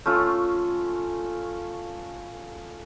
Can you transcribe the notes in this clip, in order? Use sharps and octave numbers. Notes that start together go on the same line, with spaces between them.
A3 C#4 F4